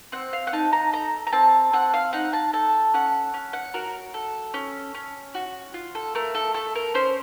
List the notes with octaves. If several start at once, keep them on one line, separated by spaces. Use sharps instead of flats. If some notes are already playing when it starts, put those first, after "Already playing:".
C4 F#5
F5
F#5
D#4 A5
A#5
A4 A#5
A#5
C4 A5
C4 F#5
F5
D#4 F#5
A5
A4 A5
C#4 F#5
C#4
F#5
F#4 A#4
A4
C#4
C#4
F#4
F4
A4
A3 A#4
A4
A3 A4
A#4
C#4 C5